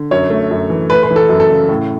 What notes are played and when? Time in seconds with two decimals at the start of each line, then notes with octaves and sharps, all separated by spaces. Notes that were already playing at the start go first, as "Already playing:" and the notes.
Already playing: D3
0.11 F#2 C#5
0.30 A3
0.51 F#2
0.70 E3
0.90 A3 B4
1.03 B4
1.11 E3
1.16 A4
1.29 F#2
1.40 A4
1.50 C#3
1.69 A2